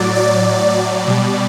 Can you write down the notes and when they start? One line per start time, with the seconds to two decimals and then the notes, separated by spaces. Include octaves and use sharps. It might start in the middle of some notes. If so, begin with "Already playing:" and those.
Already playing: A2 F#3 D5
0.15 D5
0.77 D5
1.07 B2 G3